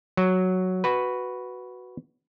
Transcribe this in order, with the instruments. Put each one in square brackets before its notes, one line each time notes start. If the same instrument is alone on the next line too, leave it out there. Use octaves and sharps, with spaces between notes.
[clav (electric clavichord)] F#3
F#4 B4